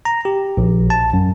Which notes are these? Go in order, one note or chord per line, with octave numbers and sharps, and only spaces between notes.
A#5
G4
A#1
A5
F#2